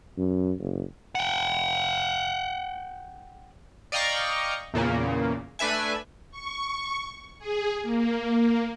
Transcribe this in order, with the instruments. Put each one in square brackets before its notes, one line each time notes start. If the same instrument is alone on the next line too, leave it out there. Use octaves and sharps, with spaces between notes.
[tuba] F#2
F#1
[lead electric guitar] F#5 G5
[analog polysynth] D5 D#5 F5 G5 A#5 C#6
E2 A#2 C#3 A#3
A3 D4 B4 E5 G#5
[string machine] C#6
G#4
A#3